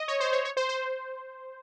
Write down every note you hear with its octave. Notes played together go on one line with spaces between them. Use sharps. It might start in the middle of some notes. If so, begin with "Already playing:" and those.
Already playing: D#5
C#5
C5
C#5
C#5
C5
C5